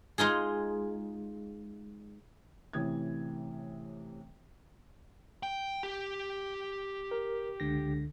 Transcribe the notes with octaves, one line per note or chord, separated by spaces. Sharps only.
G#3 D#4 F4 G#4
A2 C3 E3 C#4 D#6 G#6
G5
G4
A#4
C#2 D3 A#6